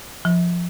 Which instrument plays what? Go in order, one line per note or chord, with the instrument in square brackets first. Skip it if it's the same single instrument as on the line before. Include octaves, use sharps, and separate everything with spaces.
[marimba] F3